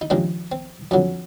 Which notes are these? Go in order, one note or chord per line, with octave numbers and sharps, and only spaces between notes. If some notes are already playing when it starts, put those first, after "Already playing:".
D#4
D#2 C#3 F3 G#3 C4 D4
C4
F2 D3 F#3 C#4